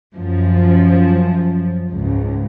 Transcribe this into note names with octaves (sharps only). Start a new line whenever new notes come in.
F#2 F3
C#2 G#2